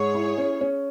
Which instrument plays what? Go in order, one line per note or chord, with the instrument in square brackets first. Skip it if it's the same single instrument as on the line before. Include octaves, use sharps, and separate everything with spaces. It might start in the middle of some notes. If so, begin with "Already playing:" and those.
Already playing: [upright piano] G#2 [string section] G#4 C#5
[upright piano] E4
C#4
C#4